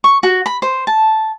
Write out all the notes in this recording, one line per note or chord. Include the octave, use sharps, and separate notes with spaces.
C#6
F#4
B5
C5
A5